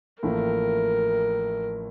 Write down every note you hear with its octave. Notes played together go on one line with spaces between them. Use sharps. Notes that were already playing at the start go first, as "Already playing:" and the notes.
A1 A2 F3 A#3 A#4